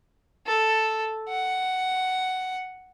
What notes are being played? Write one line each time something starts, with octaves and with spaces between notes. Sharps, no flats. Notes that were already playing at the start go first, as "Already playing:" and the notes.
A4
F#5